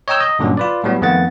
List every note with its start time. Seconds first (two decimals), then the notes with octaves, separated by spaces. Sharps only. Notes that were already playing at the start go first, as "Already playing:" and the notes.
0.08 C#5 D#5 G5 A#5 E6 G6
0.20 D#5
0.39 G2 A#2 D3 F#3 C#4
0.57 F4 B4 D5
0.84 A2 F#3 G3 B3
1.01 F2 D#3 A3 B3 F#5 A6